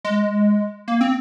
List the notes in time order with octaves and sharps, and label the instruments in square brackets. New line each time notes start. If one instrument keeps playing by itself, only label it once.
[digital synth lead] G#3
A#3
C4